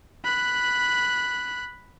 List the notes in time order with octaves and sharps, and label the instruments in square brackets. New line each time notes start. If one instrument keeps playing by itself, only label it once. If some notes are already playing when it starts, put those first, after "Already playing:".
[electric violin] B5 F#6